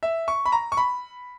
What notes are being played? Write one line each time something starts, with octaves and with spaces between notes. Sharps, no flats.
E5
C#6
B5
A#5
C#6
B5